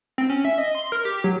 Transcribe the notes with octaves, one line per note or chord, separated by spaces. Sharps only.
C4
C#4
E5
D#5
C6
A#4
G4
F#3